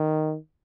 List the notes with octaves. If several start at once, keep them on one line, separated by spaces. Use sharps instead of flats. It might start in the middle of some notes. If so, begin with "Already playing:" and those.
Already playing: D#3